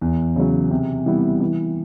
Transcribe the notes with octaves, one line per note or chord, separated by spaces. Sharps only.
E2
C#3 F#3
C3
E3 G3 B3 E4
E3